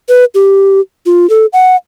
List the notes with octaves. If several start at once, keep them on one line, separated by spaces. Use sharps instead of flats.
B4
G4
F4
A4
F#5